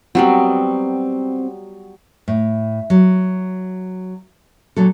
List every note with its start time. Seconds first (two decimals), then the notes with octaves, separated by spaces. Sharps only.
0.15 F#3 G3 B3 C4
2.28 A2
2.90 F#3
4.76 A#2 F#3 A4